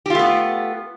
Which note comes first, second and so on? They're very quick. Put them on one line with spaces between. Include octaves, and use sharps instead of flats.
G4 F4 A3 B3